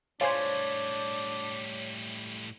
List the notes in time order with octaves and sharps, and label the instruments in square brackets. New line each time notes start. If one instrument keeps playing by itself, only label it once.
[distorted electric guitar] A2 G3 [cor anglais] D4 [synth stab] F4 G#4 C5 [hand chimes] C#5 G#6